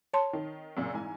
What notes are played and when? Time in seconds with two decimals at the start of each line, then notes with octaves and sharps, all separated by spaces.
0.14 C#5 A5 C6
0.33 D#3
0.77 F#2 A#2 C#3
0.94 G#2 E3 G#5